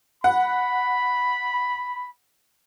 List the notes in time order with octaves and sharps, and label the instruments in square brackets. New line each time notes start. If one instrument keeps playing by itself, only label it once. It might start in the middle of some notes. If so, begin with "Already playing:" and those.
[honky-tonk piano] F#5 [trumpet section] B5